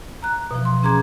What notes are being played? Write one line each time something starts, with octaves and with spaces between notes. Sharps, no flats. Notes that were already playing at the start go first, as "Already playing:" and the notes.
A#5 F#6
B2 E3 F3
C6
C#4 G#4 A#5 D6 G#6